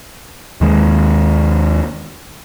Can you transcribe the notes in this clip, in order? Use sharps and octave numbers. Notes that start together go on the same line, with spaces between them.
D#2 D#3 G#3